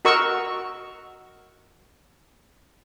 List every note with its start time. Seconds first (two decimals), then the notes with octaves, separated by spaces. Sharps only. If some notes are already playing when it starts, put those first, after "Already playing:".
0.05 F#4 A#4 D#5 C#6 E6